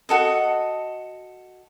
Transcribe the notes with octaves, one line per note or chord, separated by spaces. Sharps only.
F#4 A4 D#5